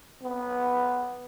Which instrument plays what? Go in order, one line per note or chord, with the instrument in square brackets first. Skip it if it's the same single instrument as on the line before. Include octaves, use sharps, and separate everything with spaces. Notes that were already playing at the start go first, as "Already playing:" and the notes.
[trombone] B3